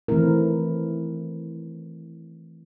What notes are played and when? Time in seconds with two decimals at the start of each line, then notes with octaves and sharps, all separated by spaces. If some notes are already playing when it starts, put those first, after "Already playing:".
0.08 D#3 E3 A3 C4 E4 A#4